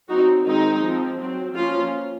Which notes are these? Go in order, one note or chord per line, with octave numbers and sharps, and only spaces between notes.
F#3 C4 D#4 F#4
D#3 G#3 C4 D#4
F3 C4
F#3 C4
F3 A#3 C#4 F4